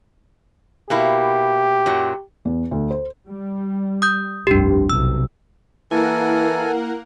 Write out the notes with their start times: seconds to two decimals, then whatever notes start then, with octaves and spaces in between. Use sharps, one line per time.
0.90 B2 A#3 E4 G4
1.86 F#2 A#2 F#3
2.45 E2
2.71 D2
2.91 C5
3.28 G3
4.02 D#6 G6
4.47 F1 C2 G2 D4 G4
4.90 B1 C3 E6
5.91 E3 A#3 E4 A4 A#4 F#5 G#5